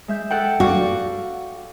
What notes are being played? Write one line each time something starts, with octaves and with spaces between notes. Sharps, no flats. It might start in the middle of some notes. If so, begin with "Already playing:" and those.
G#3 E5 G6
A4 F#5 G5
F#4 D5 F5